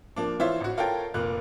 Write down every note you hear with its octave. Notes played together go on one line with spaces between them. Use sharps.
F3 A#3 D4
E3 F4 C5 C#5 E5
A1 F#4
F4 A4 A#4 C#5 G5
F1 A#2 A#3 F#6